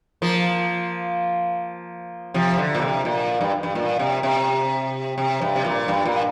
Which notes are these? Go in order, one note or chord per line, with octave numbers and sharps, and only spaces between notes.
F3 A#3
C3 F3
D3
A#2
C3
A#2
G2
G2
A#2
C3
C3
C3
G2
C3
A#2
G2
A#2